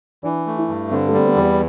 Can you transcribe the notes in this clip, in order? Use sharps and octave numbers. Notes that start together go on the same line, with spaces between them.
E3 D4
A3
E4
G2
D3 C4
A3
G3 C4
B3
E2 C4
B3